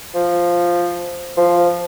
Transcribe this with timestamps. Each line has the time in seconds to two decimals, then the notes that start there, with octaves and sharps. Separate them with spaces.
0.15 F3
1.37 F3